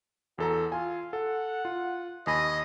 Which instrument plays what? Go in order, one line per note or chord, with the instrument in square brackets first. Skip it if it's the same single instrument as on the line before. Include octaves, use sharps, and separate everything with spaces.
[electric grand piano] E2 A4 A#5 [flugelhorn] F#4
[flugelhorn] F4 [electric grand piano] G#5
[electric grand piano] A4 [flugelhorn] F#5
[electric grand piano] F4
[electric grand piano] D#2 G#5 B5 [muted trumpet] D#5